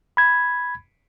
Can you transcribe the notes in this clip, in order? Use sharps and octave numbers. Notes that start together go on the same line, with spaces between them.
B5 G#6